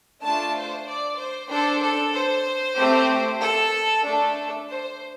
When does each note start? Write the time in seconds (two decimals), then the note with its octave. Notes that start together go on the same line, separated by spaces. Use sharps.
0.23 A3 D4 F4 A5
0.55 C5
0.87 D5
1.19 C5
1.50 D4 A4 C5
1.82 A4
2.14 C5
2.77 A3 C4 G4
3.41 A4
4.05 A3 D4 A4
4.68 C5